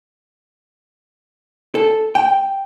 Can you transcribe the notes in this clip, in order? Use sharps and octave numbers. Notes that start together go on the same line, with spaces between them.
A4
G5